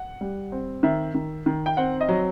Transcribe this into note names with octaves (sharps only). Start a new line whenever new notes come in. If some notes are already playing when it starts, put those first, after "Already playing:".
Already playing: F#5
G3
C4
D#3 E5
D#3
D#3
G5
C4 F#5
D#5
F#3